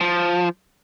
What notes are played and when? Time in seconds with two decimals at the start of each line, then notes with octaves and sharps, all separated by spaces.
0.01 F3